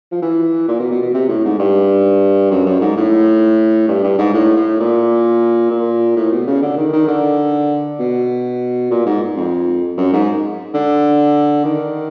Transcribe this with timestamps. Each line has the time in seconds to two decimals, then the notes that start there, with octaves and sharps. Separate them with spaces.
0.12 F3
0.22 E3
0.68 A#2
0.79 B2
0.91 B2
1.02 B2
1.14 C3
1.29 A2
1.44 G#2
1.59 G2
2.51 F#2
2.66 F#2
2.81 G#2
2.97 A2
3.88 G2
4.03 G2
4.18 G#2
4.33 A2
4.56 A2
4.80 A#2
5.71 A#2
6.16 A2
6.32 B2
6.47 C#3
6.62 D3
6.77 D#3
6.93 D#3
7.08 D3
7.99 B2
8.91 A#2
9.06 G#2
9.36 F2
9.97 F#2
10.13 G#2
10.74 D3
11.65 D#3